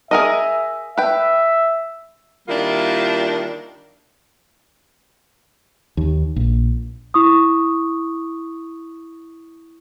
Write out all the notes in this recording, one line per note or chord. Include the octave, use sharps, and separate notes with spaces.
G#4 A#4 D#5 E5
B4 E5 G5
D#3 G3 A#3 D4 E4 F4
D#2
A#1
E4 C#6 D#6